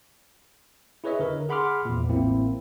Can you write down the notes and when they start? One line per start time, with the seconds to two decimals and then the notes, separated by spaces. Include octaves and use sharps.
1.04 E4 G#4 B4 C#5 D#5 E5
1.19 D3 A#4
1.49 G#4 F#5 B5 C6 D6 F6
1.85 E2 A#2
2.09 A1 A2 A#3 C4 E4